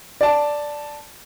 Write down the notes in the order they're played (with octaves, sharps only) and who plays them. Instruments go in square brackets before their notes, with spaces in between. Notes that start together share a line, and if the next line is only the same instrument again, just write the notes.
[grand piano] D5 A5